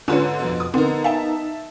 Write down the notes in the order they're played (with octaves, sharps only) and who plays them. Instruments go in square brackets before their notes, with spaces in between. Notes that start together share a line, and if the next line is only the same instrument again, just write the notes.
[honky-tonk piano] G#2 D3 [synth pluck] C#4 F4 C#5 [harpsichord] B4 A5
[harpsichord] F2 B2
[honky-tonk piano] D#6
[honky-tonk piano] D3 [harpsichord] B3 A#4 [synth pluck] C4 [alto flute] D#4
[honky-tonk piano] E5 A5 [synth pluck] F5 G5